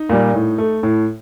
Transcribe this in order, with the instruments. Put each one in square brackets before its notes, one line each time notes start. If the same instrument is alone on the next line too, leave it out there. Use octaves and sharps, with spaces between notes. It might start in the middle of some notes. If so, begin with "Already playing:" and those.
Already playing: [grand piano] D#4
A#2 G3
A2
A3
A2